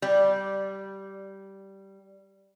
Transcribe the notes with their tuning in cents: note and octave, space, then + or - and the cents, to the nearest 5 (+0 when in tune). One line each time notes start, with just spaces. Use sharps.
G3 -10